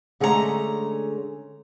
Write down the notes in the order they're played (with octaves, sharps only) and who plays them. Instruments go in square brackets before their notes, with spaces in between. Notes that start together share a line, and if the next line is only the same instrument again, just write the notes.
[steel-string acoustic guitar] D3 G#3 A3 C#4 G4 A#5